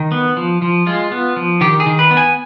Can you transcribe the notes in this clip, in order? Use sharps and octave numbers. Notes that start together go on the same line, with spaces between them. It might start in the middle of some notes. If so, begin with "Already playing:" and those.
Already playing: D#3
B3
F3
F3
G#3 F4
B3
F3
D#3 G4
G#4
D#3
B4
B3
G#5